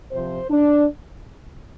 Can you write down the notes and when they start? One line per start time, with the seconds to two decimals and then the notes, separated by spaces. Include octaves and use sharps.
0.12 C3 F3 C5
0.51 D4